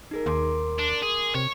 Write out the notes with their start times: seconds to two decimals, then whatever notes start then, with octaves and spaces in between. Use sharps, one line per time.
0.11 D#4 G#4 A#4
0.26 D#2 A#4 C6 D6
0.78 D4
1.02 G#4
1.35 C3 C#5